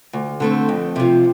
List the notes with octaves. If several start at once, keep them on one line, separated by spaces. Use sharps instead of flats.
D2
D3 A3 C4
F2
C3 F3